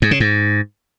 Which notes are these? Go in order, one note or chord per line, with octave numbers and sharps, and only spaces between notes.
G#2
C#3
G#2